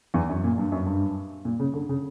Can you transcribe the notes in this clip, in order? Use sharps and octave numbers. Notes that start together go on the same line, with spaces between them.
E2
F#2
A#2
G2
F#2
G2
A#2
C#3
D3
C#3